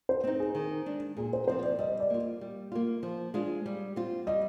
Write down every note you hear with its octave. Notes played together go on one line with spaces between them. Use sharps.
C5
C4 D#4
G#4
D#3
G#3 D4
A#2 G#4
C5
F3 C4 C5
D5
G3 D#5
D5
A#3 F4
G3
A#3 F4
F3
G#3 D4 F4
G3
C4 F4
G3 D#5